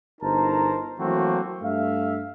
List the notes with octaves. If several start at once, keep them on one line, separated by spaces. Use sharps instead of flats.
G1 D#4 A#4 C5 A5 A#5
E3 F#3 A3 A#3 C4 F#4
G2 A3 E5 F5